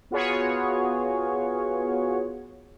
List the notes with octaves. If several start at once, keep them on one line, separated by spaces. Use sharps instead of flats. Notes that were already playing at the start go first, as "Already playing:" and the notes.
B3 F4 F#4 G#4 C#5